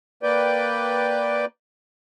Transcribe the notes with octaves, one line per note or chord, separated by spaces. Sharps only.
A#3 B4 D5 G5